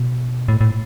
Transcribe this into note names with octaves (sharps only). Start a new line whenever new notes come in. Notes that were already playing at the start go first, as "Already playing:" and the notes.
Already playing: B2
A2
A2